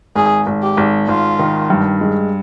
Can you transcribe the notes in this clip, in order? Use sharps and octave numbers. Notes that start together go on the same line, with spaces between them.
G#1 G#4
G#1
G4
G#1
G#1 F4
D#3
G2
G#3